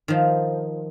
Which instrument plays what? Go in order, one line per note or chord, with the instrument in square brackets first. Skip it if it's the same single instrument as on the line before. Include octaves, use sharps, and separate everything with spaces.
[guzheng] D#3 F3